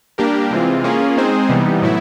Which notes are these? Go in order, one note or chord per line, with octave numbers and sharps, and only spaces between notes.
G3 A#3 D4 G4 A#4
C3 E3 G#3 C4 F4
A#3 C#4 F4 G#4
G#3 C4 D#4 G#4 C5
C3 E3 G3 B3 D#4
A2 F#3 B3 E4